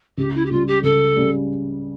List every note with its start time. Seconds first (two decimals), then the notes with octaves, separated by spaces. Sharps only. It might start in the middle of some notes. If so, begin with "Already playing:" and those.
0.18 C#2 G4
0.34 E4
0.45 G4
0.51 C#3 G3 F4
0.67 G4
0.83 C#2 A4
1.16 C#3 G3